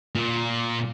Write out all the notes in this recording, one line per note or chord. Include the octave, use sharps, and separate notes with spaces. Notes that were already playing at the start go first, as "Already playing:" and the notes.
A#2